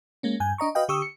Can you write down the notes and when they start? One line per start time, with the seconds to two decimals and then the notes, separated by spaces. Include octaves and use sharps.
0.23 G#3 A#3 C#4
0.40 G2 G#5 G6
0.58 D4 D#5 A#5 C#6
0.75 F#4 B4 D#5 F5 G5
0.88 D3 G4 C#6 D#6 E6
1.02 C#7